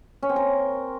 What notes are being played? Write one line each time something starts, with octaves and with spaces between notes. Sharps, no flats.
C#4
C4
A#4